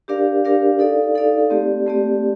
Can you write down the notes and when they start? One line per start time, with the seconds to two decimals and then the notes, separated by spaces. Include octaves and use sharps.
0.08 D4 G4 A#4 D5 F5
0.45 D4 G4 A#4 D5 F5
0.79 D#4 A4 D5 F5
1.15 D#4 A4 D5 F5
1.50 A3 C4 G4 D5
1.87 A3 C4 G4 D5